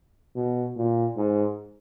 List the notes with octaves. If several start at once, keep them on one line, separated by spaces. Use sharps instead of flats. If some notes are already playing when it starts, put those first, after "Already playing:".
B2
A#2
G#2